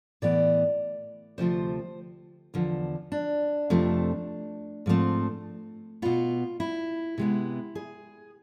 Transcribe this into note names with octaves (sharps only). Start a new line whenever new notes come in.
A2 E3 B3 D5
D2 C3 F3 A3 C5
E2 D3 F3
D4
F2 C3 F3 A3
G#2 F3 A3 C4
B2 B3 F4
E4
C3 G#3 B3
G#4